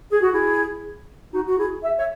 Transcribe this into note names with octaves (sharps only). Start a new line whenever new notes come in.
G#4
F#4
E4 G#4
D#4 F#4
F#4
E4 G#4
E5
C#5 E5